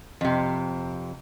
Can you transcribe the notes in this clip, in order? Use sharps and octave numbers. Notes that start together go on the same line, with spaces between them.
F2 C3